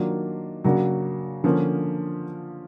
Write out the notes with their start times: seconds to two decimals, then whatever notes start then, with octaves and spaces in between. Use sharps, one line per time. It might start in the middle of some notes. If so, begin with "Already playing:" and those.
Already playing: D#3 F#3 A#3 D4 F4
0.64 C#3 F#3 A#3 D4 F#4
1.44 D3 F3 A#3 C#4